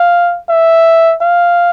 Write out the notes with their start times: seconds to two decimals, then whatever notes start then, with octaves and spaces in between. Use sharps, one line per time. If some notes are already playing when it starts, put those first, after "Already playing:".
Already playing: F5
0.49 E5
1.21 F5